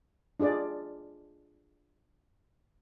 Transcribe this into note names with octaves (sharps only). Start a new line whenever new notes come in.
D4 F4 G#4 D5